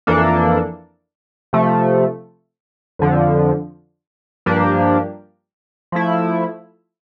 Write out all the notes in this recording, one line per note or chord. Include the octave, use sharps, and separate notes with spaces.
F2 E3 A#3 D4 A4
C3 F3 A3
F2 D3 F3
G2 F3 A#3 D4 G4
F3 A3 E4